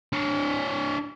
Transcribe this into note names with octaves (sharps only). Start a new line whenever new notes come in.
D4 C#5